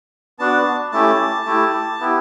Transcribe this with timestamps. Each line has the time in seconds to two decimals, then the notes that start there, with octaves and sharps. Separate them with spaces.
0.39 B3 D4 F#4 A5
0.92 A3 C#4 E4 G4 A5
1.46 A3 E4 G4
2.00 B3 E4 G4